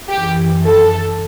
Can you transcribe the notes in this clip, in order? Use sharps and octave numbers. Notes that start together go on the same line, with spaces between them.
F#2 E3 G4
A4